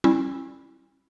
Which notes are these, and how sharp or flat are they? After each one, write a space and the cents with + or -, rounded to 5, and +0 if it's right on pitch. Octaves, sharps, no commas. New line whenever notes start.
G3 +0 C#4 -35 E4 +0